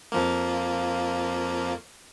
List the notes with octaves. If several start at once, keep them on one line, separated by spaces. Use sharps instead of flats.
F2 F3 A#3